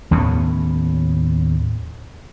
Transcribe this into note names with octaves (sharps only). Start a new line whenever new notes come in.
D#2 A2 B3 C#4